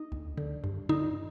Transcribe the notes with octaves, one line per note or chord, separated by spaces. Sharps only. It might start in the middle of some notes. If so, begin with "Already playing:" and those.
Already playing: D#4
D2
D3
G2
D3 D#4